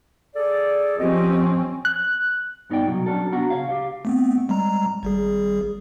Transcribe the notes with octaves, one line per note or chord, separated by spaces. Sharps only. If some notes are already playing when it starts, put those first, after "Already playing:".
G#4 A4 D5
F3 C4 C#4 F4 G4 D#5
F#6
G2 B3 D#4 C5 D5 G5
C2 B2 F#3
F#3 C#4 D4 A4
C2 B3 D4 F#4 F#5 A#5
C#3 C#5 F5
C#2 G4 F5
A3 B3 C4
G3 G#3 A#5
G#1 G3 G#4